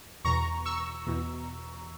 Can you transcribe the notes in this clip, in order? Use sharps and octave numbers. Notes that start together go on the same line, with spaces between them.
E2 B2 A#5 C#6
C#6 E6
E2 B2